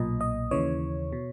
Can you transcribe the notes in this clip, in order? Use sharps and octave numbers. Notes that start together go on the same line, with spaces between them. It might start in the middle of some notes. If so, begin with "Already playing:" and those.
Already playing: B1 A#2 D#5
D#5
D#2 C#3 E3 C#5
B2